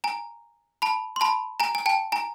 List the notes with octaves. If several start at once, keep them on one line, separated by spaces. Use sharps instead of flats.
G#5 A#5
A5 B5
C6
A5 B5
G#5 A#5
G#5
G5 A5
G#5 A#5